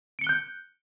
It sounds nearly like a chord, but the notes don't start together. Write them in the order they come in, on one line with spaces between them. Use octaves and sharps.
D7 C#7 G7 F#6 G6